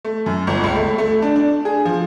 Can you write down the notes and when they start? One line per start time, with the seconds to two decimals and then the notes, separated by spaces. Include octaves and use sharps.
0.05 A3
0.26 F#2
0.47 G1
0.64 C#2
0.75 A3
0.98 A3
1.22 D4
1.36 D4
1.65 G#4
1.85 F3